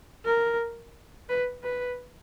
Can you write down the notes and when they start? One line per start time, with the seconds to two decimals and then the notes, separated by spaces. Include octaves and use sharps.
0.25 A#4
1.29 B4
1.63 B4